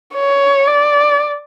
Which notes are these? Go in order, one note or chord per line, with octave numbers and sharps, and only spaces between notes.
C#5
D5